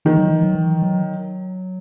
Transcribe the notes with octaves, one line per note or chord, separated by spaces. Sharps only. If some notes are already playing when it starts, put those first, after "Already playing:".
D#3 E3
F#3
E3
F#3
E3
F#3